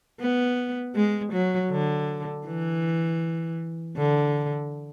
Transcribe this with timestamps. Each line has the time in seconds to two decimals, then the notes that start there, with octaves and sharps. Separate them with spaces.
0.20 B3
0.95 G#3
1.33 F#3
1.71 D3
2.46 E3
3.97 D3